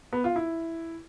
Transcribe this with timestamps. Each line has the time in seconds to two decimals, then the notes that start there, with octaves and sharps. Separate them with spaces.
0.13 B3
0.24 F4
0.36 E4